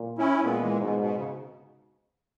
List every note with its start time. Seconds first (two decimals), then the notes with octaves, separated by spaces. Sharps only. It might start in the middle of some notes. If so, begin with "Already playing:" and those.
Already playing: A#2
0.18 C#4 E4
0.43 A#2 G#3 B3
0.61 E3 G#3
0.81 G#2 B2
0.99 B2
1.17 C#3